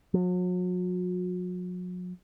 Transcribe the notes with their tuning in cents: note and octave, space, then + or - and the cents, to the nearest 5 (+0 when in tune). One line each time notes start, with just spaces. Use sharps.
F#3 -40